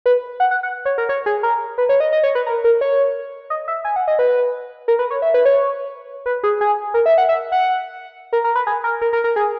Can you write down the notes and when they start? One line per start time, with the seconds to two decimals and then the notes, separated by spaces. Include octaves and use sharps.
0.06 B4
0.40 F#5
0.51 F#5
0.63 F#5
0.85 C#5
0.98 A#4
1.09 C#5
1.26 G#4
1.43 A#4
1.78 B4
1.89 C#5
2.00 D#5
2.13 D#5
2.23 C#5
2.35 B4
2.46 A#4
2.64 A#4
2.81 C#5
3.50 D#5
3.68 E5
3.85 G#5
3.96 F#5
4.08 D#5
4.19 B4
4.88 A#4
4.99 B4
5.11 C#5
5.22 E5
5.34 B4
5.45 C#5
6.26 B4
6.43 G#4
6.61 G#4
6.94 A#4
7.06 E5
7.18 F#5
7.29 E5
7.52 F#5
8.33 A#4
8.44 A#4
8.56 B4
8.67 G#4
8.84 A#4
9.01 A#4
9.13 A#4
9.24 A#4
9.36 G#4